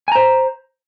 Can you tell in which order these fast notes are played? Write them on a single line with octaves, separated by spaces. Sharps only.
G#5 A#5 C5